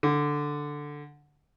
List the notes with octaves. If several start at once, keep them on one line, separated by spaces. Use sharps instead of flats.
D3